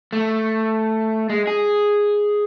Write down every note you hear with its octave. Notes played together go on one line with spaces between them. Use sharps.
A3
G#3
G#4